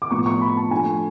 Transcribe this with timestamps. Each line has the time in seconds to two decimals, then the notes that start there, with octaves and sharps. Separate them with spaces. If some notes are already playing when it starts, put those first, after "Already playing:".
0.02 D6
0.11 A2 F3 B3 C#6
0.26 C#6
0.41 B5
0.57 A5
0.71 D3 F3 A3 G#5